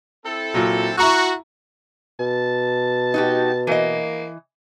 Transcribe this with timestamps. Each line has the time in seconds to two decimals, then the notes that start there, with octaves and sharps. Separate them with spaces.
0.24 C4 E4 A4
0.54 A#2 F#3
0.98 E4 F#4 A#5 C#6
2.20 B2 A5
3.14 D#4 F#4 G4
3.67 E3 A#3 D#5